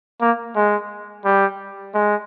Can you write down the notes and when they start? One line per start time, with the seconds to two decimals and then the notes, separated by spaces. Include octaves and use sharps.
0.21 A#3
0.56 G#3
1.25 G3
1.94 G#3